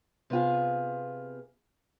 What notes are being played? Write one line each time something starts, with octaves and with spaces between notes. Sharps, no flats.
C3 B3 F4 G#4